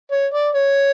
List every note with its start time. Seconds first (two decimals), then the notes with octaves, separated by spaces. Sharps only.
0.11 C#5
0.33 D5
0.55 C#5